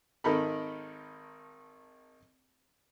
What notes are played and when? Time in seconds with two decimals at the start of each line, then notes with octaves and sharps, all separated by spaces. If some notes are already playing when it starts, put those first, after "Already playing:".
0.24 G#1 D#3 D#4 A4 A#4 B5